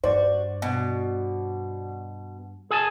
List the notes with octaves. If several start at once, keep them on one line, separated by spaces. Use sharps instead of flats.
G2 F#4 C5 D5
B2
G#4 G#5 A5